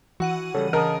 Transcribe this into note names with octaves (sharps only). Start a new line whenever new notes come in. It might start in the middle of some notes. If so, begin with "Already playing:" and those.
E3 F#4 F#5 D#7
C#3 G3 A4 C#5
C#3 A#4 D#5 A5 D#6